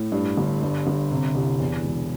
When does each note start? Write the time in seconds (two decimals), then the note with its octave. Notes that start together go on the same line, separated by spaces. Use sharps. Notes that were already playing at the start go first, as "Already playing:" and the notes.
Already playing: A2
0.12 G2
0.37 G1
0.61 G2
0.87 G1
1.11 C3
1.35 C2
1.60 E2
1.84 E1